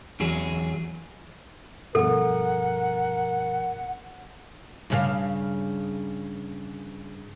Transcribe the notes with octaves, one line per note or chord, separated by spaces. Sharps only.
E2 F#3 G#4
G2 B2 F3 A4 A#4 F#5
G2 C#3 F5